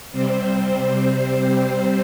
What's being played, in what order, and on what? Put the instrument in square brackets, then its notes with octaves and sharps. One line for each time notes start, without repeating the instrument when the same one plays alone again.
[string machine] C3 G3 C4 C5